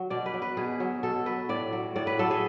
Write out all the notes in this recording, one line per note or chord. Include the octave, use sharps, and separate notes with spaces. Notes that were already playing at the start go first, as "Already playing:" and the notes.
Already playing: F#3
B2 D5
B4
F#3
B4
B2 G#4
F#3
B2 A4
F#3 B4
A2 D5
F#3
A2 D5
B4
F#3 A4
G#4